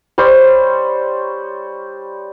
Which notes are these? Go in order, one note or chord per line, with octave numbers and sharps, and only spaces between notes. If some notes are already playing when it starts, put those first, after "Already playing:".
G3 C5 C#5